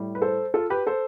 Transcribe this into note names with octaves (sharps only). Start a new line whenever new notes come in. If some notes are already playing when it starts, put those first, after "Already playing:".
Already playing: A2 G3
B4
A4 C5
F4 A4
G4 B4
A4 C5